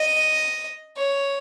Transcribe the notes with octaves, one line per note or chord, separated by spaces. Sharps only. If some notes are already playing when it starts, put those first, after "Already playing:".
Already playing: D#5
C#5